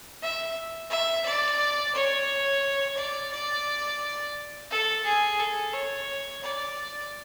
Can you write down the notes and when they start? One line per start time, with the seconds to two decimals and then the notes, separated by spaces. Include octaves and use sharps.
0.23 E5
0.90 E5
1.26 D5
1.95 C#5
2.97 D5
3.32 D5
4.71 A4
5.05 G#4
5.39 A4
5.73 C#5
6.43 D5